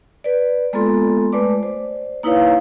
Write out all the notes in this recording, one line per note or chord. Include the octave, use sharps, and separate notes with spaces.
B4 D5
G#3 A#3 B3 F4 A4 C6
G#3 A3 B4 D5 D6
C5 D5
A#3 D#4 E4 B4 C#5 F5